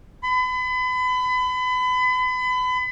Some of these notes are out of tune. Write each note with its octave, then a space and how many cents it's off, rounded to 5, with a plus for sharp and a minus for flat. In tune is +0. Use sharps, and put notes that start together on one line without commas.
B5 +35